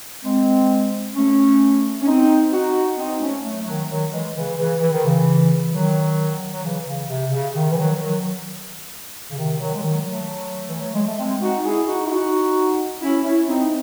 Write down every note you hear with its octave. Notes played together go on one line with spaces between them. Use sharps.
G#3 C4
A3 C#4
C#4
C4 D#4
D#4 F#4
C4 D#4
A3 C#4
F#3 A3
D#3 F#3
D#3 F#3
E3 G#3
C#3 E3
C#3 E3
E3
D#3
C#3 E3
D#3 F#3
F#3
C#3 E3
C#3
C3
C#3
C3 D#3
E3
D#3 F#3
D#3 F#3
C#3
C3 D#3
D#3 F#3
G#3
D#3 F#3
F#3 A3
E3
F#3
G#3
A3
G#3 C4
D#4 F#4
E4 G#4
D#4 F#4
E4
D#4 F#4
C#4 E4
C#4 E4
C4 D#4